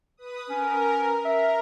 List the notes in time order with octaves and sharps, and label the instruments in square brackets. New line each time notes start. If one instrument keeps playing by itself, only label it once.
[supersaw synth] B4 D#6
[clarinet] C#4 [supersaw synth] A#4
[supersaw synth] A#4 [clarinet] E5